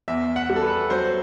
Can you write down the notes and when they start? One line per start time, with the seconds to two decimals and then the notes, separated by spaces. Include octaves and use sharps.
0.08 E2 E5
0.36 F#5
0.50 G3
0.56 A4
0.63 B4
0.90 F#3 C5